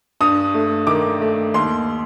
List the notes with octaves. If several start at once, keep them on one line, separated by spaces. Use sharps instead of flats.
G2 D#6
A3
D#3 D6
A3
D#2 C6